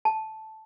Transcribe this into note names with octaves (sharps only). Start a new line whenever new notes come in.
A5